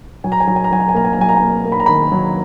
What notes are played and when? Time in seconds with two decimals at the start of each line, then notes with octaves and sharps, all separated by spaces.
0.24 F#3 G#5
0.32 A#5
0.40 G#5
0.47 F#3 A#5
0.56 G#5
0.64 A#5
0.71 F#3 G#5
0.80 A#5
0.89 G#5
0.95 A#3 A#5
1.05 G#5
1.13 A#5
1.19 F#3 G#5
1.29 A#5
1.37 A#3 G#5
1.65 A#3
1.72 B5
1.80 A#5
1.86 D#3 B5
2.12 F#3